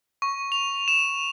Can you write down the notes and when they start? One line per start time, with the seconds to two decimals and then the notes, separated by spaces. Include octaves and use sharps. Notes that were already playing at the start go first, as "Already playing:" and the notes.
0.22 C#6
0.52 F7
0.88 E7